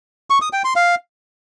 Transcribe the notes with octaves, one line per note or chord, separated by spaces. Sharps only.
C#6
D#6
G5
C6
F5